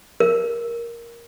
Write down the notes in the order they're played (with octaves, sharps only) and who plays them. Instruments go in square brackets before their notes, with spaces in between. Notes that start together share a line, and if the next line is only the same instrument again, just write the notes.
[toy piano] A#4